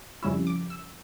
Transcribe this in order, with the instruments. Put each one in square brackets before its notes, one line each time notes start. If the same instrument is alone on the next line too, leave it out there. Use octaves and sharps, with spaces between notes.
[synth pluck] F2 C#3 G3 C#4 E4 E6
D6
E6